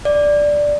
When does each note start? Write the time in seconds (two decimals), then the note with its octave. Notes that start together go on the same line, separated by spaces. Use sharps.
0.05 D5